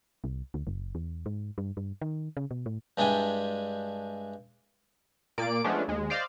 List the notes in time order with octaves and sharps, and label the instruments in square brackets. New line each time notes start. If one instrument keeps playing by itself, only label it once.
[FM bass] C2
D2
F#1
E2
G#2
G2
G2
D#3
C#3
B2
A2
[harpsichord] G2 G#3 D4 E4 G5 G#5
[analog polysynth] A#2 A#3 D5 D7
F3 G#3 A3 B3 C#4 D4
D#2 G#3
C5 D5 D#5 F5